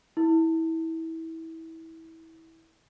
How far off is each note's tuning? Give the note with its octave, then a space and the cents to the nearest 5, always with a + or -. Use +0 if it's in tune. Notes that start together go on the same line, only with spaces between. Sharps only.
E4 -25